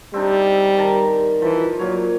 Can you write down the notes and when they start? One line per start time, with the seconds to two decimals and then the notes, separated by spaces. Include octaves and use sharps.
0.14 G3 C4 D4 D#4
0.77 D#3 A5 A#5
1.42 E3 F3
1.79 A#2 F#3 C#5